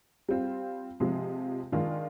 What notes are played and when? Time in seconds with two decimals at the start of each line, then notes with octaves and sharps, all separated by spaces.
0.29 G3 C4 F4
1.00 C3 F3 G#3
1.72 D#3 G#3 D4 F4